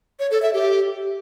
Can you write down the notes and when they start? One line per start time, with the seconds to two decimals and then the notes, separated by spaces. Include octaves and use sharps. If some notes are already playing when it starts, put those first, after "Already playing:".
0.19 C#5
0.31 A4
0.42 E5
0.54 G4